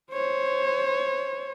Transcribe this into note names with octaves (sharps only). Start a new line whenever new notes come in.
C5 C#5